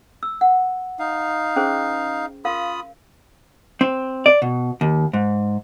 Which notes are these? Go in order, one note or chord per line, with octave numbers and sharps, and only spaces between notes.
E6
F#5
D#4 F5
C#4 G#4 C5
F4 A#4 F5 B5 D#6
C4
D5
B2
D#2
G#2